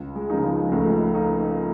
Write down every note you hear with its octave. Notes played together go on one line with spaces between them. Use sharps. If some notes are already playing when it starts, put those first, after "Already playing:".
Already playing: C#2
G#3
C#3 F3 A#3 D#4
G#3
C#2 A3
A#3 D#4